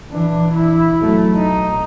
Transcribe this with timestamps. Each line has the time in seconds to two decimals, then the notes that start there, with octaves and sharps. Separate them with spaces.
0.10 E3 D4
0.54 E4
1.00 F#3 A3
1.36 D#4